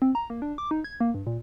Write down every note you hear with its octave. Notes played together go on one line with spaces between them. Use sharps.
C4
A#5
A#3
D4
D6
D#4
G#6
A#3
G2
A#2